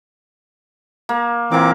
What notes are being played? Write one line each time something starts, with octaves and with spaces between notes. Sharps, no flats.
A#3
A#2 E3 A#3 C4 D6